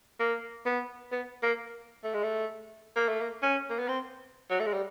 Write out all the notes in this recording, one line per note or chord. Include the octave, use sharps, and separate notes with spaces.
A#3
B3
B3
A#3
A3
G#3
A3
A#3
A3
A#3
C#4
A#3
B3
C4
F#3
A3
G#3
G3